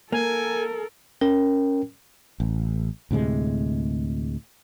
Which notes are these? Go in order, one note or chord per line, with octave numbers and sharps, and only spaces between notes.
A#3 A4 A#4 G#5
C#4 A#4 G5
A1
D2 A2 C3 G#3